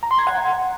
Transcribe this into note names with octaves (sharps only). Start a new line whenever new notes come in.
A#5
C6
G#6
F#5